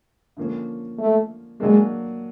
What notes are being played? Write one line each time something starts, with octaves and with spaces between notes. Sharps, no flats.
D3 F3 A#3 C#4
A3
F#3 G#3 A#3 D4